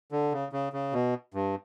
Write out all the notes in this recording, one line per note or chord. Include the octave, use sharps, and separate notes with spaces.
D3
C#3
C#3
C#3
B2
G2